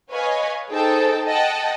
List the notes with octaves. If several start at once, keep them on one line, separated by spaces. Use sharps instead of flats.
B4 C#5 D#5 F5 G#5
D#4 G#4 A4 C5 G5 A5
D#5 F#5 G5 A5